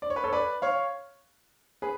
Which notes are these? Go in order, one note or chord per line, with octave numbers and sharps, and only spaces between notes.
D5
C#5
B4
A4 C#5
B4 D5
C#5 F5
G#4 B4